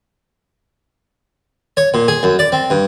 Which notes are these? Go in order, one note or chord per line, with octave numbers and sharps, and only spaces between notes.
C#5
A#2
G#4
F#2
D5
C4
G2